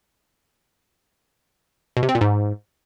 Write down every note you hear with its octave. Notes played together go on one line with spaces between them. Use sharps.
B2
C3
C4
A#2
G#2